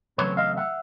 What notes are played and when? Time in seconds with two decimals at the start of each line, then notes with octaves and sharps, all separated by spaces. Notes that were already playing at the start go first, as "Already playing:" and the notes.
0.18 E2 C#3 F#3 A3 C4 B4 C#5
0.37 D#5 F5
0.57 E5 F#5